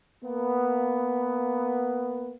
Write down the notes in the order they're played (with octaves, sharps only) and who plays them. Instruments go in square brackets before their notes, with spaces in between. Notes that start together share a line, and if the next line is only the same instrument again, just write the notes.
[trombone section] A#3 B3